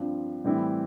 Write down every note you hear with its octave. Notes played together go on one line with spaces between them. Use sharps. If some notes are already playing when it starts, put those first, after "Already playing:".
Already playing: G2 F3 C4
A2 E3 G3 C4 E4